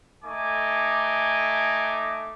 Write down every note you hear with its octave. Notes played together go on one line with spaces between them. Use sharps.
A3 D#4 G#5 D6